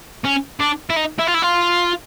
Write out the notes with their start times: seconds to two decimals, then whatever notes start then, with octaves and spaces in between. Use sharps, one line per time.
0.25 C#4
0.60 D4
0.90 E4
0.96 D#4
1.19 E4
1.28 F4
1.35 E4
1.43 F4